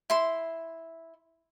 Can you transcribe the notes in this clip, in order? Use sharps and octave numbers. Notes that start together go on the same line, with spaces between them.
E4 C6